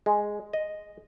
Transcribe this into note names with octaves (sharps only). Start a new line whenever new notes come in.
G#3
D#5